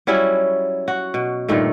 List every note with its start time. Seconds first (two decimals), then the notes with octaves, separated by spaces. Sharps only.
0.07 F#3 G3 C#4 E4
0.88 F#4
1.14 B2
1.48 G2 A#2 D#3 A3